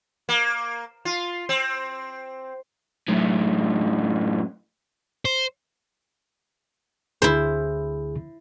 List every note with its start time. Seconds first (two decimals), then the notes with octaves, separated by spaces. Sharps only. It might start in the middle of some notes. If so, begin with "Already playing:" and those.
0.29 A#3
1.05 F4
1.49 C4
3.08 F#2 A2
5.25 C5
7.22 D2 D3 E4 G#4 C5